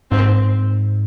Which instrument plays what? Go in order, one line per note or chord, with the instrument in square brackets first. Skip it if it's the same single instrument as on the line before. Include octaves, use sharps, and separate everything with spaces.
[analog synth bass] G#2 [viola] C4